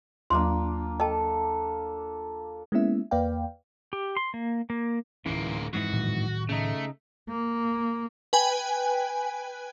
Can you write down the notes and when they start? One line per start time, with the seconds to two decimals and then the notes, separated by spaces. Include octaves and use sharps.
0.30 D#2 F#3 A#3 D4 F4 C6
1.00 A4 D#5 G5 A5
2.72 G#3 A#3 B3 C#4 E4 E5
3.11 E2 A#3 B4 D5 F5 G5
3.93 G4
4.17 C6
4.34 A#3
4.70 A#3
5.26 D1 G#2 E3 A#3 C#4
5.73 F2 G#2 E3 F#4
5.93 A2 D#3 F#3
6.49 C#3 A3 D#4
7.29 A#3
8.33 B4 G5 G#5